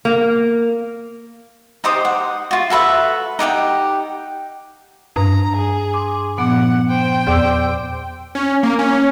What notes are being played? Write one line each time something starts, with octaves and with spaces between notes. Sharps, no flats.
A#3
D#4 G4 C5 D#6
F#5
F4 F#4
F#4 A4 B4 E5
D#4 G4 F#5 G5
G2 A#5 D#6
G#4
C6 D6
A#2 F3 B3 F#5
C5 G5
E2 D5 D6 E6
C#4
A#3
C#4